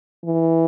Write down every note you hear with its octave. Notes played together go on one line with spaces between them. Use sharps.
E3